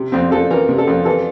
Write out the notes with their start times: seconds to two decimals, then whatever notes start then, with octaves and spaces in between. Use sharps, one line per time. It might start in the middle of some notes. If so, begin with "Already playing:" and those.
Already playing: C3
0.12 F2 C4
0.31 F2 A4
0.50 E3 A#4
0.69 C3
0.78 A4
0.87 F2
1.05 E3 A4